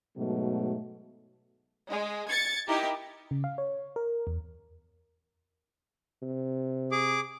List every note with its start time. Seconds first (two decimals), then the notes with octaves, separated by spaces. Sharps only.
0.17 G#2 B2 F#3 A3
1.89 G#3
2.28 G#6 A6 C#7
2.67 D#4 E4 G4 A#4
3.31 C#3
3.44 F5
3.58 C#5
3.96 A#4
4.27 E2
6.22 C3
6.92 G#4 D6